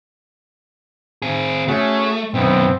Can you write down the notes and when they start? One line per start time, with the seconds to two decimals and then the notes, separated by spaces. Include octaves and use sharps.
1.22 C4 G#4
1.68 A3 C#4 F#4 G#4
2.34 F#2 B2 B3 C4